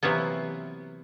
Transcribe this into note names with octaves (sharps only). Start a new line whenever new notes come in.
C3 E3 F#3 A#3 B3